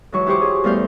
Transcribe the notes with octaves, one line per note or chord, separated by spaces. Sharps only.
G#2 E3 F#3 C#6
E4 F#4 G4 C5 C#6 D6
G#4
E2 G3 A3 F5 F6 G6